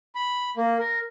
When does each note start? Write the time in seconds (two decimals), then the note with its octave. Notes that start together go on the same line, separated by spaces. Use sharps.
0.15 B5
0.57 A#3
0.79 A#4